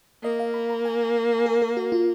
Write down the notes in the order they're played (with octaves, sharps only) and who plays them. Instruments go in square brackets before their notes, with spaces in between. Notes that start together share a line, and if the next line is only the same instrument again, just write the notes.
[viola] A#3 [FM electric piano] D#5
[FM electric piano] F5
B5
A#5
G#5
A#4
A#4
F#4
F4